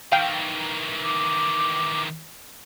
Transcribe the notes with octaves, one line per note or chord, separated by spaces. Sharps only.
D#3 E3 F5 G5
D6